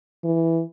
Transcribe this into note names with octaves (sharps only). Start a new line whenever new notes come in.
E3